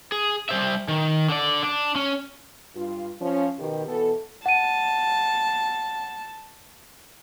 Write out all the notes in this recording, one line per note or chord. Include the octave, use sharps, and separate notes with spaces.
G#4
G3 C5 E5
D#3
D3 D5
D4
C#4
G2 F4
F3 C#4
B2 D#3 G4
B2 E3 B3 A4
F#5 A5 D#7